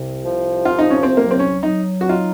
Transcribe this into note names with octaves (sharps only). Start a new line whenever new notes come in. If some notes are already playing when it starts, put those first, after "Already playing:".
Already playing: C2 C3
F3
C2 F4
D#4
C#4
C4
F#3 A#3
C4
C#4
F#3 D#4
F#4
D#4 F4